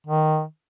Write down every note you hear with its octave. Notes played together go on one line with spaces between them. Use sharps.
D#3